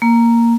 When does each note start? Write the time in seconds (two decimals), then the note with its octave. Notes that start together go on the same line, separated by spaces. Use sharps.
0.02 A#3